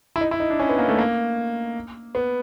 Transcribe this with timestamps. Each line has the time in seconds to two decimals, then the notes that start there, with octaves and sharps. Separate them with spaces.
0.16 E4
0.21 D#4
0.31 E4
0.40 D#4
0.50 D4
0.59 C#4
0.69 B3
0.79 A#3
0.88 A3
0.99 A#3
2.15 B3